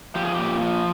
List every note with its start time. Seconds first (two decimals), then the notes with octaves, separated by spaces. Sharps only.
0.15 F3 G4
0.25 G#4
0.34 A#2 G4
0.61 F3